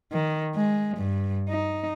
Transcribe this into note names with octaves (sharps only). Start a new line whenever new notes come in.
D#3
G#3
G2
D#4